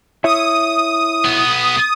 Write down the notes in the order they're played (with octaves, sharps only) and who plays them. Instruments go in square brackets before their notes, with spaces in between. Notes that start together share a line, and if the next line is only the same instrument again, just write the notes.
[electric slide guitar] E4 C#5 E5 [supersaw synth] D#6
[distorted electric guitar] B1 B3